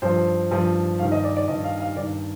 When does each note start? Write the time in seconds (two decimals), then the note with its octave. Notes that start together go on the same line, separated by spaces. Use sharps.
0.02 G2 F3 C5
0.51 G2 F3
0.99 G2 D#3 F5
1.12 D#5
1.24 D5
1.36 D5
1.48 G2 D#3 D#5
1.64 F5
1.80 F5
1.96 G2 D#3 D5